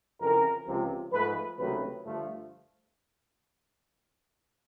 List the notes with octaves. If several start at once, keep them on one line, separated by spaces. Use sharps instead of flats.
F2 C#3 E3 A#4
C#2 C3 F3
G#2 F3 A3 B4
C#2 C3 D#3 F#3 A3 B4
G2 D3 F3 A3